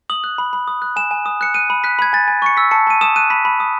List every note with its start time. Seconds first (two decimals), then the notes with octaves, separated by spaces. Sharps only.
0.10 D#6 F#7
0.24 F#6
0.38 B5
0.53 B5
0.68 D#6
0.82 F#6
0.96 G#5 E7
1.11 G#5
1.26 D#6
1.41 F#6 C#7
1.54 F#6 D#7
1.70 B5
1.84 F#6 B6
1.99 B5 G#6
2.13 G#5 A6
2.28 G#5
2.42 C#6 C#7
2.57 E6 B6
2.71 A5 C#7
2.87 A5 D#7
3.01 D#6 E7
3.16 F#6 D#7
3.30 B5 B6
3.45 B5
3.60 D#6